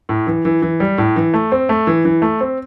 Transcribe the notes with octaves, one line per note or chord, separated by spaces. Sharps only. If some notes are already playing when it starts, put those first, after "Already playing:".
A2
E3
E3
E3
G3
A2
E3
A3
C4
A3
E3
E3
A3
C4